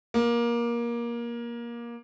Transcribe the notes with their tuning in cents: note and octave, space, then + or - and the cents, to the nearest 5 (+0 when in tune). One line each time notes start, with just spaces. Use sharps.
A#3 +20